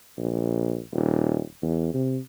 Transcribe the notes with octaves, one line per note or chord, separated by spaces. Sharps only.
A#1
D#1
E2
C3